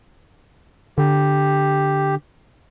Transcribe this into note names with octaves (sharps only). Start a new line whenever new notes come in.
D3 G4